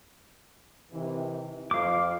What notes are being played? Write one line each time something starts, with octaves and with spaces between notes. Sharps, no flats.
C3 D#3 E3
F2 F4 F5 D6